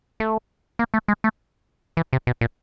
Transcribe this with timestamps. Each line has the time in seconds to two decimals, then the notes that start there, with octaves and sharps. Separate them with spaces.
0.20 A3
0.79 A#3
0.94 A3
1.08 G#3
1.24 A3
1.97 E3
2.13 C3
2.27 B2
2.41 A#2